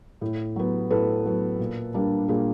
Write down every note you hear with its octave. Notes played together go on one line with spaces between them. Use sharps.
A2
F#3 B3
A2 A4 B4
F#3 B3
A#2
G3 A#3 D4
A#2 G#4 A#4